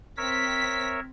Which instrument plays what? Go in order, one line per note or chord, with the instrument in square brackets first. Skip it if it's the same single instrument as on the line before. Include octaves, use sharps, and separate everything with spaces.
[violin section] C4 B6 [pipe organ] A#4 C#5 E5